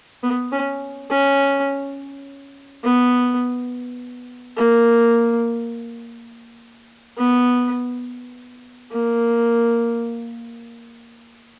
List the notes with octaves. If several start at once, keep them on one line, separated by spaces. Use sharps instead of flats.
B3
C#4
C#4
B3
A#3
B3
A#3